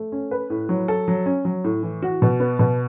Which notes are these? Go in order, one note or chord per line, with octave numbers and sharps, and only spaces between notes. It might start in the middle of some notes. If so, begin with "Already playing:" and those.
Already playing: A3
C#4
B4
A2
F#3
A4
F#3
C#4
F#3
A2
E3
F#4
B2
B3
B2